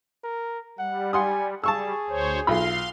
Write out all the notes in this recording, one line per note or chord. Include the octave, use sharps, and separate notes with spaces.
A#4
G3 F#5
F#5 G#5 C6 D#6
G3 G#4 A5 C#6 E6
D2 C5 C#5
B1 F4 F5 B5 C6